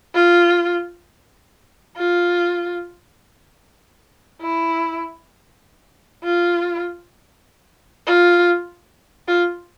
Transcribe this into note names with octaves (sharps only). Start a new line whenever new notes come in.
F4
F4
E4
F4
F4
F4